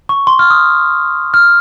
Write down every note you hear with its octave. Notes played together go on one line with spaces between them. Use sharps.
C#6
C6
F6
D#6
F6